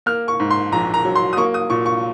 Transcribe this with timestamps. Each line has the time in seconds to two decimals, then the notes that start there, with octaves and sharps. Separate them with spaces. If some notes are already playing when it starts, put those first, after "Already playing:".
0.06 A#3 F6
0.28 C#6
0.40 G#2
0.51 C6
0.72 A#1 A#5
0.94 A#5
1.05 F#3
1.16 C6
1.33 D#6
1.37 A#3 C#6
1.54 D#6
1.70 A#2 C#6
1.86 C#6